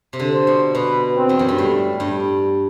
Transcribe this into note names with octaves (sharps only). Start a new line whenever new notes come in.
C3
D3
C5
B2
B2 B4
C4
E2
F#2
G2
A2 G3
G2